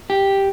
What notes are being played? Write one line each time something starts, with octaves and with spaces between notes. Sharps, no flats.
G4